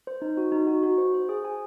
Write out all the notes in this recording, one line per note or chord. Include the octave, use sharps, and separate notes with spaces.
C5
D#4
F#4
D#4
F#4
F#4
C5
C5
G#4
G#5